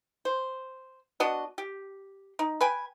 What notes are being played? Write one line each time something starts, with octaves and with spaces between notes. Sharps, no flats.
C5
B3 D4 F#4 D#5
G4
D#4
B4 G5 G#5